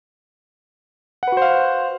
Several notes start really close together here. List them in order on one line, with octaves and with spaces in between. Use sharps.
F#5 B4 F#4 C5 F5